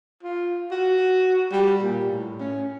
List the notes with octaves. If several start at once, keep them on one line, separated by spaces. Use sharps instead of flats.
F4
F#4
G3
A#2
A2
C#4